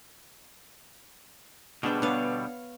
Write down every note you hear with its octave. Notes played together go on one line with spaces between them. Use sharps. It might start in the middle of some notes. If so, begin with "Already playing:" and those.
B2 D3 G3 G#3 B3 D4 C5
B3 D4 C#5 F5